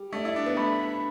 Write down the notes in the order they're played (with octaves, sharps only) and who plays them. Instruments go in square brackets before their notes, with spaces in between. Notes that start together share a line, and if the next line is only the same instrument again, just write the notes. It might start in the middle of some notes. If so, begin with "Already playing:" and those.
Already playing: [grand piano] G3
[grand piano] A3 [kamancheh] D5
[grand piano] E4
D4
B3
[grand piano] A3 [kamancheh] B5